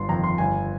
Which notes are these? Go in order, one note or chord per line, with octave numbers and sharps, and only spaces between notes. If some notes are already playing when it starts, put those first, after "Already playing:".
Already playing: G1 C6
F2 D#3 A#5
C6
G1 G#5